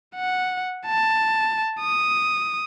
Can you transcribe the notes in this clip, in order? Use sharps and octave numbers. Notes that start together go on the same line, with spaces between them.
F#5
A5
D#6